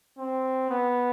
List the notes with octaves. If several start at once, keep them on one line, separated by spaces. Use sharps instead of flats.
C4
B3